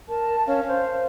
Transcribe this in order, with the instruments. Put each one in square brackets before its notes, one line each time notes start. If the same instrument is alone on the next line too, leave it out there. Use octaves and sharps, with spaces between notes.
[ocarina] A#4 [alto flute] A5
[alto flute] C#4 [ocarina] F5
[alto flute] C5